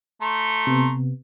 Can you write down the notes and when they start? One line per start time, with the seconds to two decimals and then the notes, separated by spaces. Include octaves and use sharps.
0.22 A3 A#5 C6
0.67 C3 B3